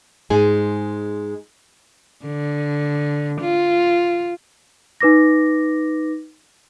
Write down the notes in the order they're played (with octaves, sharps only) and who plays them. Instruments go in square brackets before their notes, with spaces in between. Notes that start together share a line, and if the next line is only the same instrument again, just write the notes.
[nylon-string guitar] G#2 G#3 D#4 G#4 G#5
[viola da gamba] D3
F4
[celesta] D#4 B4 D6 A#6